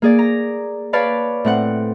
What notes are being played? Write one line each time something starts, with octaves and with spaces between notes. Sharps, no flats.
A#3 G#4 D5
A#5
B4 C#5 D5 F5 A5 B5
A2 C4 F#5